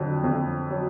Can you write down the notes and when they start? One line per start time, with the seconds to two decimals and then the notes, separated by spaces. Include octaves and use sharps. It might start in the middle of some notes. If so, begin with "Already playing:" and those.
Already playing: F2 D3 F#3
0.24 F2
0.71 F#3